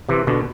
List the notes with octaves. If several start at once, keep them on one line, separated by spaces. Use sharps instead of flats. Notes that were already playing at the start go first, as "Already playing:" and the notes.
C3 E3
B2 D3